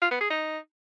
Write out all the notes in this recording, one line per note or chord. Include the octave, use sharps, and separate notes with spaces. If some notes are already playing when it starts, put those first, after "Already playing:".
F4
B3
G#4
D#4